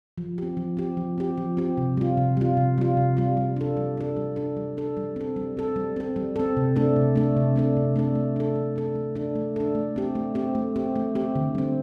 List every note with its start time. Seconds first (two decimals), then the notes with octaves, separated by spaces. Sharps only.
0.18 F3
0.38 C4 G4
0.57 F3
0.77 C4 G4
0.97 F3
1.18 C4 G4
1.37 F3
1.57 C4 G4
1.77 C3
1.97 G3 F4
2.17 C3
2.37 G3 F4
2.57 C3
2.78 G3 F4
2.97 C3
3.17 G3 F4
3.37 G3
3.56 D4 A4
3.77 G3
3.97 D4 A4
4.17 G3
4.36 D4 A4
4.57 G3
4.77 D4 A4
4.97 G3
5.16 C4 A4
5.36 G3
5.57 C4 A4
5.76 G3
5.96 C4 A4
6.16 G3
6.36 C4 A4
6.57 C3
6.76 A3 D4 A4
6.96 C3
7.16 A3 D4 A4
7.37 C3
7.56 A3 D4 A4
7.77 C3
7.96 A3 D4 A4
8.15 A3
8.36 D4 A4
8.56 A3
8.76 D4 A4
8.95 A3
9.15 D4 A4
9.35 A3
9.56 D4 A4
9.75 A3
9.96 C4 G4
10.15 A3
10.35 C4 G4
10.55 A3
10.76 C4 G4
10.96 A3
11.15 C4 G4
11.35 D3
11.55 G3 C4